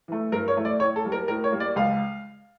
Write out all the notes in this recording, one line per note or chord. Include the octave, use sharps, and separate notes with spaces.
E3 A3
G2 A#4
C#5
E3 A3
D5
A2 C#5
A4
G3 A#3
A#4
A2 A#4
C#5
G3 A#3
D5
C#2 F5